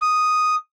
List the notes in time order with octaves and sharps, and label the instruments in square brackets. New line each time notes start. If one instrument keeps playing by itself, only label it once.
[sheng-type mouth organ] D#6